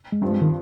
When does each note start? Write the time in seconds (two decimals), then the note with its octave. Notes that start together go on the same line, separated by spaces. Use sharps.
0.12 G#3
0.22 G2 F3 G3 C4
0.32 G#3
0.42 D#3